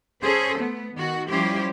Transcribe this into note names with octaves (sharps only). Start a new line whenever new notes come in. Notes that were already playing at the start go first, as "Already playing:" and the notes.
C#4 G#4 A4 C5
A3 B3
D#3 F#4
F3 G3 C#4 E4 G4 C5